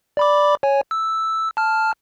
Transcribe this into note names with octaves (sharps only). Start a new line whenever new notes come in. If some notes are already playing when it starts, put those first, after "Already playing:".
D5 B5 D6
C#5 G#5
E6
A5 F6